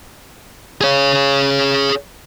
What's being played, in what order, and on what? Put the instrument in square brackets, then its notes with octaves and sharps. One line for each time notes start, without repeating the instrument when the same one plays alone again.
[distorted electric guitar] G#4 C#5